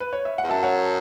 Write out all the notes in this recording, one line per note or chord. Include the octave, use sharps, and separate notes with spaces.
B4
C#5
E5
F#5
E2
F#2 E5 A5
C#5 F#5